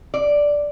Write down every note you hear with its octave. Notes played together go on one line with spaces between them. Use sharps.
D5